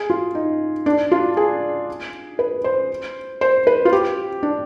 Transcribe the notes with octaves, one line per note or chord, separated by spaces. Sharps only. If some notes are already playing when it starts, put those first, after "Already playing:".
Already playing: G#4
F4
D#4
D4
F4
G#4
B4
C5
C5
B4
F4
G4
D4